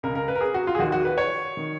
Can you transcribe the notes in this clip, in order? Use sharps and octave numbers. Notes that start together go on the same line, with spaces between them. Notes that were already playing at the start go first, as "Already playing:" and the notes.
C#2 C#3 A#4
A#4
B4
A#4
G#4
F#4
F4
G#4
D#2 D#3 F#4
F#4
B4
C#5
D#3